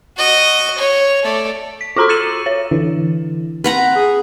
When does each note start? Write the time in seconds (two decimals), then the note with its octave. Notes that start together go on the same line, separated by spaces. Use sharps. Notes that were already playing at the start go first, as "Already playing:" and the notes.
0.17 F#4 D#5
0.78 C#5
1.23 A3 D5
1.81 B6
1.96 F4 F#4 A4 A#5 C6 E6
2.09 E6 A6 C#7 D#7 E7 F#7
2.46 C#5
2.71 D3 E3
3.64 C4 B4 F#5 A#5
3.96 G#4